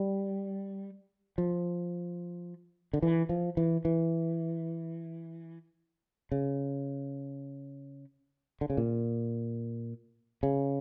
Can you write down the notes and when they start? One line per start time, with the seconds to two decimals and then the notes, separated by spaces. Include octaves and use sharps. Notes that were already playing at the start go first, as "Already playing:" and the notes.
Already playing: G3
1.38 F3
2.93 D3
3.02 E3
3.29 F3
3.57 E3
3.85 E3
6.32 C#3
8.61 D3
8.70 C#3
8.77 A#2
10.43 C#3